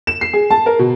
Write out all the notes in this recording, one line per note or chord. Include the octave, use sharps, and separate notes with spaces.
E7
C7
G#4
A5
A#4
B2